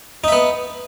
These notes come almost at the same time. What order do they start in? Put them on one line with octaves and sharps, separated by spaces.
D#4 E5 B3